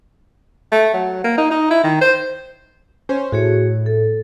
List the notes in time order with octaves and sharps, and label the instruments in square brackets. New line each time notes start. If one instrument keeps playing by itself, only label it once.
[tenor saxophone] A3
F#3
A#3
D#4
D#4
E4
D#3
C5
[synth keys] C#4 C5
[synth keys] A2 [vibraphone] F#4 G#4 C#5
[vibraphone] A4